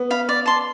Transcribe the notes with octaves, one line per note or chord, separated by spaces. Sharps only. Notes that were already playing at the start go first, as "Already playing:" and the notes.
Already playing: B3
F5 B5
D5
A5 C6